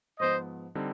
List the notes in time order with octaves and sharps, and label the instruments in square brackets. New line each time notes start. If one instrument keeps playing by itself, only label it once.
[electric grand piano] G#2 F3 B3 [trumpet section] C5 D#5
[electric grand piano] D3 G3 C4 D#4